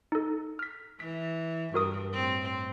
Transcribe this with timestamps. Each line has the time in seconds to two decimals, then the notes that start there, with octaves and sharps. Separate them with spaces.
0.12 D#4 A4
0.59 F6 B6
1.00 E3 B6
1.74 G2 F#4 A#4 D#6
2.13 A2 C4